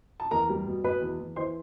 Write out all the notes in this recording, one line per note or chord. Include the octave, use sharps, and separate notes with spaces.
A5
E2 A#4 A#5
G3
B2
B2 B4 B5
E2
E2
E3 C5 C6